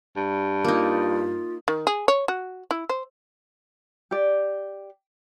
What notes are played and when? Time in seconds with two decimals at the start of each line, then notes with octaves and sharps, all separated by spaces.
0.17 G2
0.64 A#3 D#4 F4
1.68 D#3
1.87 G#4
2.08 C#5
2.28 F#4
2.71 E4
2.89 C5
4.11 G4 D5